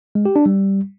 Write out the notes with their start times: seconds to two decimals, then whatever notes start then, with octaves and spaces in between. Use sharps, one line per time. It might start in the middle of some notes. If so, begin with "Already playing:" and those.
0.15 G#3
0.25 G4
0.36 D4
0.46 G3